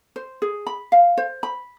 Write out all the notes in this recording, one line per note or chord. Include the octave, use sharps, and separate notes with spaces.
C5
G#4
B5
F5
C5
B5